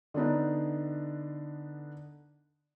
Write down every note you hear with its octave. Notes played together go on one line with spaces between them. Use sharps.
D3 B3 D4 D#4